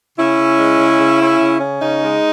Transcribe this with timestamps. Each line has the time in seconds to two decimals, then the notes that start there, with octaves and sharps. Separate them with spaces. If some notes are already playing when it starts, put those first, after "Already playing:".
0.17 C#3 C#4 E4
0.39 C#3
0.59 G#3
0.79 C#3
0.99 C#3
1.20 C#4
1.39 C#3
1.60 C#4
1.80 C#3 D#4
2.02 G#3